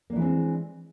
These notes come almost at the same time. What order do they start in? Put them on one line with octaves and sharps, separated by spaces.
A#3 D4 E3 G#3 C4